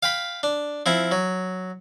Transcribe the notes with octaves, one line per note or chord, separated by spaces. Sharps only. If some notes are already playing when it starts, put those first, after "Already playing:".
F5 G5 B5
D4
F3 C4 E4
F#3